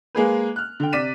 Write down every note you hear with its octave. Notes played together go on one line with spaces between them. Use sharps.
G#3 A#3 G#4 B4
F6 F#6
D3 G5
C3 D5 B6 D#7 E7